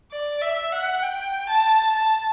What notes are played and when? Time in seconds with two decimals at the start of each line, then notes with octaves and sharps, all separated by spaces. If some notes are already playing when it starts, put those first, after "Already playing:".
0.12 D5
0.42 E5
0.73 F#5
1.03 G5
1.49 A5
1.95 A5